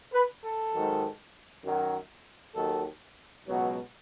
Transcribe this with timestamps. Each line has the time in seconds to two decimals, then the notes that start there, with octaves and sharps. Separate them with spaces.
0.13 B4
0.44 A4
0.73 G#2 D#3 F#3
1.65 F#2 D#3 F#3
2.55 D#2 D#3 F#3 A4
3.46 C#2 B2 F#3